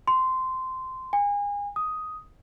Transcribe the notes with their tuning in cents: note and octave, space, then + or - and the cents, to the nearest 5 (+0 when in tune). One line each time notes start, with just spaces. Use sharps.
C6 -15
G#5 -35
D#6 +5